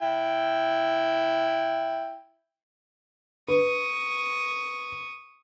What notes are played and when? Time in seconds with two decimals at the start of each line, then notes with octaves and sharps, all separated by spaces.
0.02 E4 G5
3.48 B4 C#6 D#6